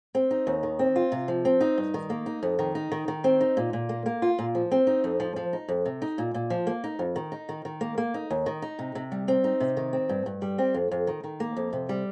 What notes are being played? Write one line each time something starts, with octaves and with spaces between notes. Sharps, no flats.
C4
D#4
D#2
D#3
C4
F4
C3
F3
C4
D#4
G2
D#3
A#3
D#4
F2
D#3
D#4
D#3
D#3
C4
D#4
A#2
A#2
A#3
A#3
F4
A#2
F3
C4
D#4
F2
F3
F3
D#4
F2
C3
D#4
A#2
A#2
F3
A#3
D#4
F2
D#3
D#4
D#3
D#3
A#3
A#3
D#4
D#2
D#3
D#4
C3
C3
G3
C4
D#4
C3
D#3
C4
G2
G2
G3
C4
F2
F2
D#3
D#3
A#3
F2
C3
G3